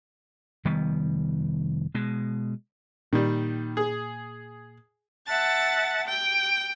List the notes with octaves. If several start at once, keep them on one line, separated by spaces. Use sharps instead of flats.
F1 D#3 G3 B3
B2 G#3
A#2 D#3 G3
G#4
E5 F#5 A5 A6
G5